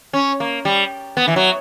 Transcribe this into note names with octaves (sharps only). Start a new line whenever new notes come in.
C#4
A#3
G3
B3
E3
F#3